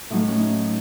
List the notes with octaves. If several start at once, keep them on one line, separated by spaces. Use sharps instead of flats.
A2 F#3 A3 D#4
C#4
D#4